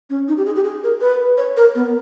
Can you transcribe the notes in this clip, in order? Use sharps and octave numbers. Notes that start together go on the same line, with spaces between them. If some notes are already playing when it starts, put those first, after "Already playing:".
C#4
D#4
G4
G#4
G4
G#4
A#4
B4
C#5
A#4
B3